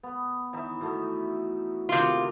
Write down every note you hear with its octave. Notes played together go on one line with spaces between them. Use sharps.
B3
E3 D#4 E5
B2 A3
C3 D#3 F4